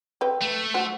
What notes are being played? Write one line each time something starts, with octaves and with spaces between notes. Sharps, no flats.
C4 B4 G5
A3
F#4 C5